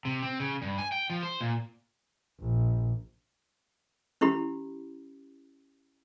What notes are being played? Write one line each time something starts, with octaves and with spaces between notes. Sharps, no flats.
C3
C4
C#3
G2
G#5
G5
F3
C5
A#2
A#1
C#4 E4 G4 B5